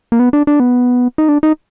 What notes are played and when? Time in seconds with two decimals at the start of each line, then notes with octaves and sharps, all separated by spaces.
0.12 A#3
0.20 B3
0.33 D4
0.47 D4
0.60 B3
1.18 D#4
1.29 D4
1.43 D#4